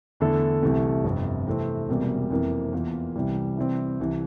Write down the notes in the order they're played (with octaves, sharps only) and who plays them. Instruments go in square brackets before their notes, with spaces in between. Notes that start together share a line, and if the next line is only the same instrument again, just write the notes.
[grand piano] E2 D3 A3 E4 A4
C2 C3 E3 A3
G1 F2 C3
C3 E3 A3 C4
E1 E2 C3 G3 A#3
F2 C3 E3 A#3
E2 E3 A#3 F4
C2 C3 E3 G3
C3 E3 G3 C4
C2 C3 E3